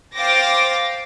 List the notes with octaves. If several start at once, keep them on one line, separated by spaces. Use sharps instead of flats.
C5 F5 G5 D6 A6 A#6